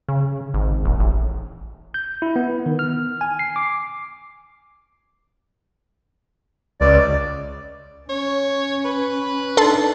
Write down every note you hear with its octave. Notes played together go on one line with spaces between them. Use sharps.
C#3
G#1
D#1
A1
G6
E4
B3
D#3
F6
G#5
C7
D6
C#2 D5
C#4 C#5
B4
D4 D#4 A4 A5 C6